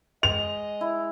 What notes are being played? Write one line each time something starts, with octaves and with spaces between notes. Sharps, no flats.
G#3 D#5 F7
E4